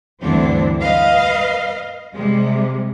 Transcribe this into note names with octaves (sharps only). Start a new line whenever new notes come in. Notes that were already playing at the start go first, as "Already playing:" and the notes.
D2 G2 D3 E3 C4 D4
B4 D#5 F5
C3 G3 G#3